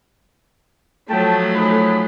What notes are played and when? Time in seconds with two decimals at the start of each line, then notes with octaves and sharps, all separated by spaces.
1.10 F3 F#3 A3 G5 A5
1.55 D#4 G#4 B5